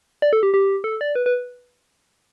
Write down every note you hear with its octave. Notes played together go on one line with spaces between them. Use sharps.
D5
A4
G4
G4
A4
D5
B4
B4